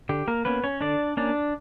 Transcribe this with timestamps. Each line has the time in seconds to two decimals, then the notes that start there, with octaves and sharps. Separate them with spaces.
0.09 D3 G4
0.28 A#3 A#4
0.45 A#3 B3 C#4 B4
0.64 C#4 C#5
0.81 D3 D4 D5
1.17 A#3 C#4 D4 D5